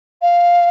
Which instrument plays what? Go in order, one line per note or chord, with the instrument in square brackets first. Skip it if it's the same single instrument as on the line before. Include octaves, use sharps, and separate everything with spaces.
[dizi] F5